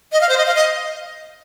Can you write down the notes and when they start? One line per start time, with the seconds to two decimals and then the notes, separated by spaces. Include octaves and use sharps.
0.12 D#5
0.21 F5
0.29 C5
0.38 D#5
0.46 F5
0.55 D#5